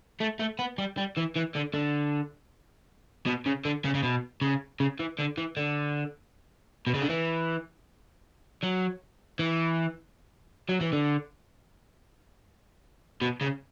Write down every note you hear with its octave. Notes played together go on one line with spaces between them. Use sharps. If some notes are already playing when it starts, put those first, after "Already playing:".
A3
A3
B3
G3
G3
E3
E3
D3
D3
B2
C#3
D3
C#3
C#3
B2
C#3
C#3
E3
D3
E3
D3
B2
C#3
D3
E3
F#3
E3
F#3
E3
D3
B2
C#3